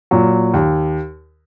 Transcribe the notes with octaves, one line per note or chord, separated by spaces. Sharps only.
A#2 F#3
D#2